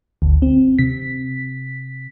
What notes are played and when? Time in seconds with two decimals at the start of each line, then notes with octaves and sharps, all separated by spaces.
0.22 G1 D2
0.42 C4
0.79 C3 B6